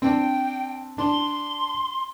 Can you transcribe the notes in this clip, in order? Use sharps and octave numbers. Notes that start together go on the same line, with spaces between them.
C4 D4 G5
D4 C6